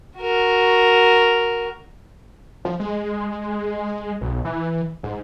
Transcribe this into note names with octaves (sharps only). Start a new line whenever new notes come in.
F#4 A#4
F3
G#3
B1
E3
G#2